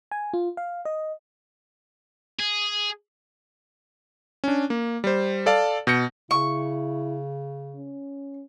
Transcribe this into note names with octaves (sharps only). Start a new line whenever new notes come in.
G#5
F4
F5
D#5
G#4
C#4 D4
A#3
G3 C5
A4 D5 F5 A5
B2 G6 A#6 C#7
C#3 E4 C#6
C#4